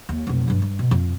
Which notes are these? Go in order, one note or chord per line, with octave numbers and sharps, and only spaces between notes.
D#2
F1 B1
G2 F#3
G2
B2
F2